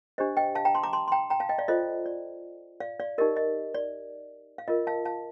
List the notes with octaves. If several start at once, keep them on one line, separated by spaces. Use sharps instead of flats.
D4 G4 C5 D#5
D#5 G5
F5 A5
G5 A#5
A5 C6
A#5 D6
A5 C6
C6
G5 A#5
G5 A#5
F5 A5
D#5 G5
D5 F5
F4 A4 C5 D#5
D5
D5 F5
D5 F5
D#4 G4 A#4 D#5
D#5
D5
F5
F4 A#4 D#5
F5 A5
F5 A5